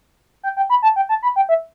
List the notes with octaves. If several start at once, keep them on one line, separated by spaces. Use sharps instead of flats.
G5
G5
B5
A5
G5
A5
B5
G5
E5